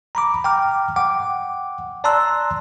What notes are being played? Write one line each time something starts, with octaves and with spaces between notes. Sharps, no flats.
A#5 B5 D6
G5 A#5 D6 F6
F#5 G5 D6
D5 A5 A#5 C6 E6 F#6